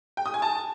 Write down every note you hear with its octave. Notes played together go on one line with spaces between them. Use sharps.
G5
D#6
G#5
A5